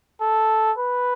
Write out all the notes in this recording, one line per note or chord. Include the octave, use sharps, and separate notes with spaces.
A4
B4